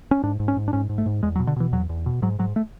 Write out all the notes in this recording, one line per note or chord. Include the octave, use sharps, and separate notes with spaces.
C#4
G#2 D4
G#2
C#4
G#2
D4
G#2 C#4
G#2
A3
G#2
E2 G#3
F#3
B2
D3
B2 E3
E2 F#3
E2
B2
G#2 F#3
G#2 F#3
A3